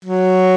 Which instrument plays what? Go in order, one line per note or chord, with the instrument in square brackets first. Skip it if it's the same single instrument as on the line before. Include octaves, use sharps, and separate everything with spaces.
[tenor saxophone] F#3